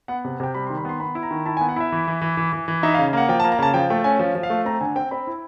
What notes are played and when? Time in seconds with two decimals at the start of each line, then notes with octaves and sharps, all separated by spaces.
0.08 B3 F#5
0.25 C3
0.40 C3 G5
0.55 G3 B5
0.67 C6
0.70 D#3
0.77 B5
0.85 B3 C6
1.00 B3 B5
1.15 E4
1.23 A#5
1.31 D#3
1.46 E4 A5
1.57 G#5
1.61 B3
1.69 F#5
1.76 E4 E5
1.92 E3
2.07 E3
2.21 E3
2.37 E3
2.53 E3
2.68 E3
2.83 D#4 E5
2.94 F5
2.99 C#3
3.13 A#3 F#5
3.29 F3 G5
3.40 A5
3.44 A#3
3.52 A#5
3.59 C#3 A5
3.74 F3 G5
3.90 A3 G5
4.04 C#4 G#5
4.19 F3
4.35 F3
4.43 F5
4.50 A3
4.65 C4 A#5
4.81 D3 G#5
4.96 C4 G5
5.11 C4 B5
5.27 E4